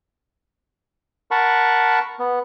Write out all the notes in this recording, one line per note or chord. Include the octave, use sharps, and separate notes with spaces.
A#4 F#5 A5 B5 C#6
B3